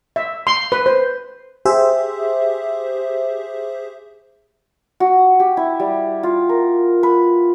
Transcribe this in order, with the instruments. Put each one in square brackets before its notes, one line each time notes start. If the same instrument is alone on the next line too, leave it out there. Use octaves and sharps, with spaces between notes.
[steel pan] E5
C6
B4
C5
[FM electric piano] G4 G#4 C5 E5
[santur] F#4
G4
E4
G3
F4
A#4
B4